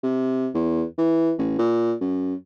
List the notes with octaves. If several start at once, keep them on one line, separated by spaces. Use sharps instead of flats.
C3
E2
E3
A1
A#2
F#2